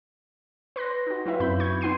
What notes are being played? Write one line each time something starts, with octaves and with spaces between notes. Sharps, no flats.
B4 C6 F#6 A#6
D#4 F#4
F#3 E4 B4 E5 F5
F#2 C4 B5 G6
C#6 G6 G#6
B3 D#4 F#5 C6 C7 D#7